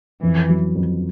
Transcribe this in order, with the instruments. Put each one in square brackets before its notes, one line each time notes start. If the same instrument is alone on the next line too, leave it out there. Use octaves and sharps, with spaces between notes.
[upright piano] F2 [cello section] E3
[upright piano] F#3
F2